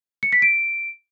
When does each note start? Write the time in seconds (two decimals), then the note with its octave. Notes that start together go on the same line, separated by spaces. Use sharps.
0.23 C#7
0.32 B6
0.42 D7